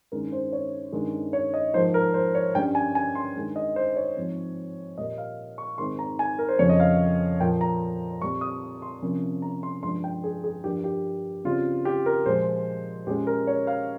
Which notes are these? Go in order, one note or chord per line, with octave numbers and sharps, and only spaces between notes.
G2 D#3 G#3 C#4 A#4
C5
C#5
G2 D#3 G#3 C#4
C#5
D#5
G#2 F3 A#3 C5
A#4
C5
C#5
G2 G3 C#4 G5
G#5
G#5
C6
G2 D#3 G#3
D#5
C5
C#5
G#2 F3 C4
A#2 G3 A#3 D#5
F5
C#6
G#2 D#3 G#3 C4 C6
A#5
G#5
A#4
C5
F2 C#3 F3 C4 C#5
D#5
F5
A#2 F3 A#3 G5
A#5
A#2 G3 C4 C#6
D#6
C6
C3 F3 A#3 C#4
A#5
C6
G2 F3 G#3 C6
G5
G#4
G#4
G2 F3 A#3 G4
G4
C#3 G3 C4 F4
G4
A#4
A#2 F3 G#3 C5
A#2 G#3 C#4 G4
A#4
C#5
F5